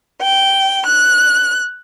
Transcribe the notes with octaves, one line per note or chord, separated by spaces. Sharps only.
G5
F#6